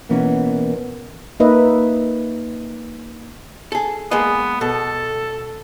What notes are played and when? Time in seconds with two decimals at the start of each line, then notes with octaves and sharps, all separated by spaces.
0.09 B2 E3 A#3 B3 C#4
1.40 A#3 D#4 B4 D#5 E5
3.72 G#4 A4
4.11 G#3 A#3 B3 D#5
4.61 B2 A4